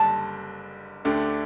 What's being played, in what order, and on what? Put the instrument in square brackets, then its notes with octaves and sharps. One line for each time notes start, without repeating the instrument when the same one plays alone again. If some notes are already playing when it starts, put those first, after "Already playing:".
Already playing: [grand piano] F#1 D3 G3 [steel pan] A5
[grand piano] D2 D3 A3 D4 G4